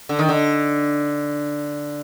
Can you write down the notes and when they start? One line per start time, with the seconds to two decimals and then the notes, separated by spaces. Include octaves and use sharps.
0.09 D3
0.19 D#3
0.29 D3